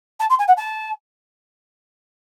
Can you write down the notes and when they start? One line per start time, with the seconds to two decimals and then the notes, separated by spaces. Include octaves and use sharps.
0.20 A5
0.30 C6
0.39 G#5
0.48 F#5
0.57 A5